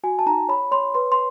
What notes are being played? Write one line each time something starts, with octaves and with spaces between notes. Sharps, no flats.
F#4 G#5
A5
D#4 A#5
C#5 B5
C#5 C6
B4 C6
C6